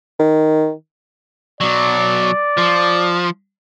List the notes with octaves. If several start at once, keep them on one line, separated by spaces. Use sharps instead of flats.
D#3
B2 F#3 D5
F3